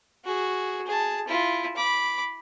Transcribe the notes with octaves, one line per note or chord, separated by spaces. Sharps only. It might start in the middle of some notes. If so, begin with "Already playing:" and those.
F#4 G#4
G#4 A5
E4 F4
B5 D6